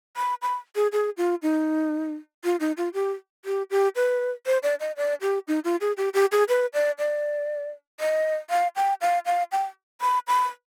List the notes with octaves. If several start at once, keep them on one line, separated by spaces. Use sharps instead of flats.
B5
B5
G#4
G#4
F4
D#4
F4
D#4
F4
G4
G4
G4
B4
C5
D5
D#5
D5
G4
D#4
F4
G#4
G4
G4
G#4
B4
D5
D5
D#5
F5
G5
F5
F5
G5
B5
B5